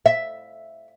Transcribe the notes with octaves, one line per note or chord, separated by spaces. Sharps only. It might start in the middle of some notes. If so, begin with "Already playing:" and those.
E5